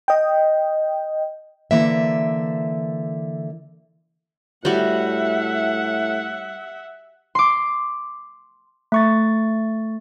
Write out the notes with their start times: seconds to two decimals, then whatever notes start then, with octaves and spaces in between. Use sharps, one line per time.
0.08 D#5 G5
1.71 D3 E3 A#3 E5
4.65 A2 G3 F#4 E5 F#5
7.35 C6 D6
8.92 A3 C#6 A6